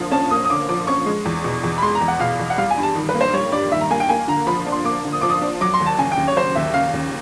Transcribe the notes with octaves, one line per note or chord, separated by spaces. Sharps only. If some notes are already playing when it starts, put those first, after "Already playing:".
Already playing: D3 F3 A#3
C#4 A5
A#3 D#6
D#6
D3 D6
F3 D6
C#4 C#6
G#3
E2
B2
E2
B5
G#3 C6
A#5
E2
F#5
B2 F5
E2
F#5
G3 F5
G#5
G2
A5
D#3
B4
A#3
C5
G3 C#5
G2 D5
D#3 E5
A#5
A#3 G#5
G5
A#3 G#5
D3 A#5
F3 B5
D4
C6
A#3 D6
D3
D#6
F3 D6
D#6
D4
F#3 D6
C6
D#2
A5
C#3 G#5
G5
D#2
C#5
F#3 C5
D#2 E5
C#3 F5
D#2